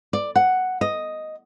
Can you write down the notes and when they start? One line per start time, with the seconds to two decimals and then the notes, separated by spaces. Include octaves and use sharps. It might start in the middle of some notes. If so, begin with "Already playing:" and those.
0.13 D5
0.36 F#5
0.81 D#5